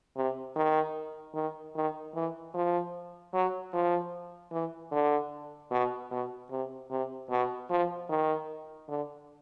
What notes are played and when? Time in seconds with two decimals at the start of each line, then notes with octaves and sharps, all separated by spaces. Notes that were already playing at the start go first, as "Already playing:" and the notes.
0.16 C3
0.56 D#3
1.35 D#3
1.75 D#3
2.15 E3
2.54 F3
3.34 F#3
3.73 F3
4.52 E3
4.92 D3
5.71 B2
6.11 B2
6.51 C3
6.90 C3
7.30 B2
7.70 F3
8.10 D#3
8.88 D3